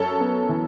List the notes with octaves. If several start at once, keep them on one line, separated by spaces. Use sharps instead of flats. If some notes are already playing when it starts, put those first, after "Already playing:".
Already playing: F#2 A4 C#5
B3
E3